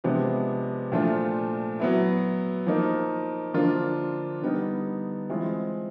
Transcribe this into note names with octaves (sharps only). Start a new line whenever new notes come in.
C3 F3 G#3 B3 D4
A#2 F3 A3 D4 F4
F#3 B3 E4
F3 A#3 D#4
D3 F3 A#3 D4 F4
D3 G3 B3 D#4
E3 G#3 C4 F4